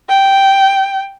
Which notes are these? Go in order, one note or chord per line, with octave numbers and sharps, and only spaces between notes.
G5